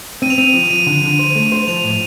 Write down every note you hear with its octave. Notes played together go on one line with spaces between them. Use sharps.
C4 D#7
F7
C4 D#7
F3
F3 D#7
D3
D3
C5
A3
C5
F3 F7
A2